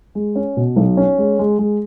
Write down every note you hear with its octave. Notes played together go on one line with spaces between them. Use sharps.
G#3
C#4
B2
B1
C#4
G#3
G#3
G#3